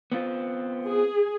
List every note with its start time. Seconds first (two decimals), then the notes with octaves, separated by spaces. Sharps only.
0.12 B3 C4 F4
0.85 G#4